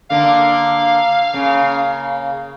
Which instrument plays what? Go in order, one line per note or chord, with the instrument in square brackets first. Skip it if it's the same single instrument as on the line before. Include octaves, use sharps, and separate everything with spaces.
[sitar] D3 A#3 [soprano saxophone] F5
[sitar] C#3 A#3